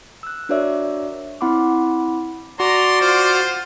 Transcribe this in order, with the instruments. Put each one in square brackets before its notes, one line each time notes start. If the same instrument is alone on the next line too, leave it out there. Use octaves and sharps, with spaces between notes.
[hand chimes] E6 F#6
D4 F#4 A#4 C#5 D5 E5
C4 E4 F#5 B5 C6 D6
[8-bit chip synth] F#4 [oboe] D5 [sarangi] A#5 [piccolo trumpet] C6
[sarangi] F4 [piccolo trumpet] C5